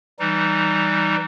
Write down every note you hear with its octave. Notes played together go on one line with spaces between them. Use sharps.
E3 G3 D#4